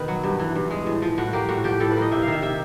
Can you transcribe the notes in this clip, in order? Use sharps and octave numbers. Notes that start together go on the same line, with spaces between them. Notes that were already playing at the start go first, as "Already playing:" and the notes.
Already playing: B2 D#3 B4
F#3
G2
E3
G2
G#3
A2
F3
A2 F#4
A#3 G4
A2 F#4
F3 G4
A2 A4
B4
A#3
D#5
C3 E5
F5
D#3 E5
C3 E5